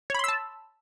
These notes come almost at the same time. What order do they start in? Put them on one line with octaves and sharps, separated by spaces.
C#5 B5 C6 E6 A5